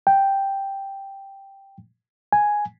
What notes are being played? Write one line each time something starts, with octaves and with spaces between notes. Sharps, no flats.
G5
G#5